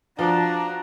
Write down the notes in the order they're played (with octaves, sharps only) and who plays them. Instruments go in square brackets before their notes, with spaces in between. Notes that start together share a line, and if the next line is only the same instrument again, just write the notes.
[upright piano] F3 [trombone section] D4 [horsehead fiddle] F#4 A#5